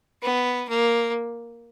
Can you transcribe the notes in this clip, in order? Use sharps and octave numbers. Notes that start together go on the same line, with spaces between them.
B3
A#3